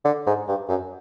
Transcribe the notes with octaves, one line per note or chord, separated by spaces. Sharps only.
D3
G#2
G2
F#2